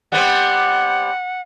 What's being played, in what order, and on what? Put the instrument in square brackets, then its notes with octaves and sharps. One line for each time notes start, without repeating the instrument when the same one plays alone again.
[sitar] G3 B3 C4 [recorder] F#5